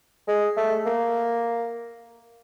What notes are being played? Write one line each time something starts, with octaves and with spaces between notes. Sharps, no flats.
G#3
A3
A#3